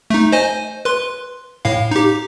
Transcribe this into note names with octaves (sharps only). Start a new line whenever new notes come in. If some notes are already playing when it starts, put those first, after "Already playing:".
A3 D#4
C5 D#5 G#5
B4 C6
A2 F5
D#4 G4